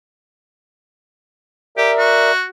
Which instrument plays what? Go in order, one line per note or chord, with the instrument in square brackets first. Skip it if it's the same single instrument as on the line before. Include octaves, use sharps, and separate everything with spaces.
[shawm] G4 [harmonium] A#4 D5 E5
[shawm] F#4